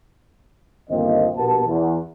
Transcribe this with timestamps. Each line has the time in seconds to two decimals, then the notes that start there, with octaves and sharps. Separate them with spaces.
0.90 G1 D#2 F3 A#3 C4 D#5
1.36 A#1 B2 B3 G4 A#4 A5
1.67 E2